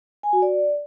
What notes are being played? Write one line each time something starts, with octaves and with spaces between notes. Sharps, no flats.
G#5
F#4
D5